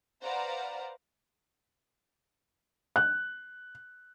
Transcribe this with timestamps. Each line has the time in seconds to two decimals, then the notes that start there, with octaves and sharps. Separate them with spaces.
0.22 B4 C5 D5 F5 F#5 A#5
2.96 F#6